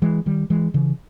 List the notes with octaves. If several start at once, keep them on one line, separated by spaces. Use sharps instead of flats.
E3 G#3
D#3 G3
E3 G#3
C#3 E3